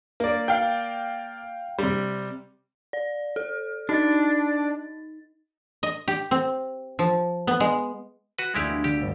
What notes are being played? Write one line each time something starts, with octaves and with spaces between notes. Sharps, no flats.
A#3 D5
F5 G5
C3 G3
D5
A4
D4 D#4 D#5 A6
D#5
G4
C4
F3
B3
G#3
F#4 B4
D2 G#3 E4 G4 F5
B3 B6
D3 G4
G1 A4